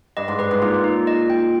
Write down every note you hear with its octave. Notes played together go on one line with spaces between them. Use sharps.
G2 D#5
G#2
G2 B4
G#2
A#2 D#4
D#4
D#5
G5